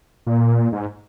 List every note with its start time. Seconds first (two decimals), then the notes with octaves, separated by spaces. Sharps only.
0.26 A#2
0.72 G#2